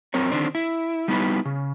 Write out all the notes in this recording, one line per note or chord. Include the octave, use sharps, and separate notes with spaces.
F#2 C4 A#4 C#5
D3 D#3 C4 D4
E4
G3 B3 D#4 E4 B4
C#3